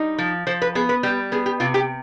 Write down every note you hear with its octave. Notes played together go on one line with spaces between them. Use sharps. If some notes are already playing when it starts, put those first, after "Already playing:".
Already playing: G3 D#4
F3
F3 C5
B4
B3 G#4
B4
G3 G4
B3 G#4
G4
C3 F4
G4